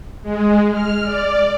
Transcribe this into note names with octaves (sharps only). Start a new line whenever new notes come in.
G#3
F6
D5